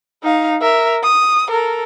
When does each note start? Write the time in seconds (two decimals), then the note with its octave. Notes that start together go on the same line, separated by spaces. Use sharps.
0.24 D#4 F5
0.61 A#4 E5
1.03 D#6
1.49 A4 A#4